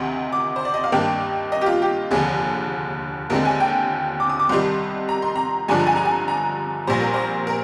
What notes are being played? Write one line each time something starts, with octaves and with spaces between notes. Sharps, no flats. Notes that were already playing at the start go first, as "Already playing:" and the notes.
Already playing: D2 C3 D#3 C6
D6
C5
D5
D#5
F5
G2 D#3 A#3 D4 G5
D#5
G4
F4
G4
F1 D#2 D3 G#4
D#2 D3 G#3 C4 A#4
G#5
G5
D6
D#6
D6
C2 C3 D#3 G3 C6
A#5
C6
A#5
G2 D3 F3 G#3 D4 G#5
A#5
G#5
A#5
G#5
A#5
A#1 A#2 G3 C5
A#4
C5
A#4